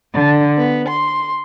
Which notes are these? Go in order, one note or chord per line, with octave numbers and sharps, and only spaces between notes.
D3
B3
C6